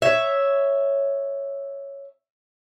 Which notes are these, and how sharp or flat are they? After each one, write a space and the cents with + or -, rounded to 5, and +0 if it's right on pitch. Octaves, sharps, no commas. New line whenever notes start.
C#5 +0 E5 +0